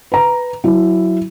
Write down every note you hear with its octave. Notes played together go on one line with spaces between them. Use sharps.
B4 A#5
F#3 E4